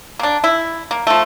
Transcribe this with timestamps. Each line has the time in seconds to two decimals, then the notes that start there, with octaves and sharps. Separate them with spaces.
0.19 A#3 D4
0.44 E4
0.91 A#3
1.07 F3 A3